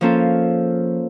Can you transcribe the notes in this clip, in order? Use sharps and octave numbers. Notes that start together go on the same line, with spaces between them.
F3 A#3 C#4 F4 A4